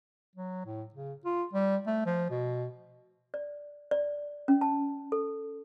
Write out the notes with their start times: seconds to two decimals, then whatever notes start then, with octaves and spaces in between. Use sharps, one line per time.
0.35 F#3
0.65 A2
0.94 C#3
1.25 F4
1.53 G3
1.87 A3
2.06 F3
2.30 B2
3.34 D5
3.91 D5
4.48 C#4
4.61 A5
5.12 A4